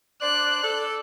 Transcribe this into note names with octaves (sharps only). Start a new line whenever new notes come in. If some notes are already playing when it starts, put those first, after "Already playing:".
D4 C5 D5 F#6
A4 D5